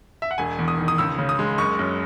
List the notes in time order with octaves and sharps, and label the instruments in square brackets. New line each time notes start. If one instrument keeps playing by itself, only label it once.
[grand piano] E5
F#5
E1 G#5
E2
D#6
D#3
D#6
C#2 E6
C#3
D#6
G#3
F#1 C#6
F#2